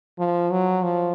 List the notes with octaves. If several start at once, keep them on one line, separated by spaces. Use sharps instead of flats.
F3
F#3
F3